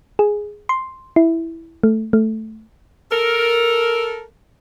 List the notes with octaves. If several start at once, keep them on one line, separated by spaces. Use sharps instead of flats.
G#4
C6
E4
A3
A3
A4 A#4